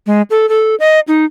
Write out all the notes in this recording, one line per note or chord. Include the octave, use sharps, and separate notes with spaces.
G#3
A4
A4
D#5
D#4